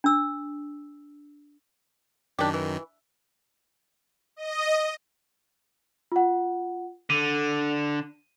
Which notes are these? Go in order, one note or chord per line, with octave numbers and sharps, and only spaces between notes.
D4 E6
F#2 D#3 D4 G4
E3
D#5
F4 F#5
D3 D#7